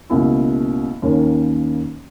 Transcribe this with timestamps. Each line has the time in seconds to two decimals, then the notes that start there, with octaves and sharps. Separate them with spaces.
0.10 C#2 B2 A#3 E4
1.02 D#2 D#3 A#3 C#4